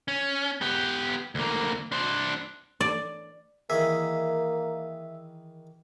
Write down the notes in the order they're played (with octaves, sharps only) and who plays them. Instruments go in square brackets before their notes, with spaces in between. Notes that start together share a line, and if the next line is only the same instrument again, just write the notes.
[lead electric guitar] C#4
B3 G4
D2 A#3
D4 C5
[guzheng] D5
[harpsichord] D#3 E3 G#4 [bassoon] A#3 [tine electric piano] E5